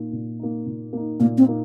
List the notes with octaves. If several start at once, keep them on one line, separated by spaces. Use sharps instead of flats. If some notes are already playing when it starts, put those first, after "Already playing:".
Already playing: A#2 A#3 D#4
A#2
A#3 D#4
A#2
A#3 D#4
A#2 A#3
C4
A#3 D#4